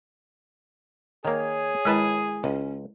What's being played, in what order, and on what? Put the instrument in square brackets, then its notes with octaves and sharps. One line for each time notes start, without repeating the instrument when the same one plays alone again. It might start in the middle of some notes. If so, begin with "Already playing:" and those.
[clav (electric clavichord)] D#3 A#3 [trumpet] G#4 [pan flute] C#5
[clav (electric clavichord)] D#3 B4 A5 [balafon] G#3 E4
[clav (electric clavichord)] C#2 [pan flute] C#4